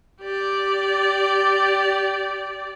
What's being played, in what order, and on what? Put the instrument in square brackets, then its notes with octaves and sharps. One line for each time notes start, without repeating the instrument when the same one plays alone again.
[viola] G4 D5